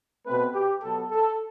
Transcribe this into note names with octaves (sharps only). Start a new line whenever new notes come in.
B2 A3 C4 B4
G4
B2 F#3 B3 A4
A4